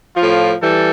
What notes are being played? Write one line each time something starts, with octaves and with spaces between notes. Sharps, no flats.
A2 F3 F4
E3 G3 A4